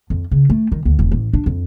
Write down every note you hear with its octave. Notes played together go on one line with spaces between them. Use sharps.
F2
C#3
A3
D#3
D2
E1
A1
D4
F2